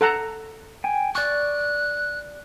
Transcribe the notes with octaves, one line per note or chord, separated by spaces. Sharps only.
A4 F#5 A#5
G5 G#5
D5 C#6 F#6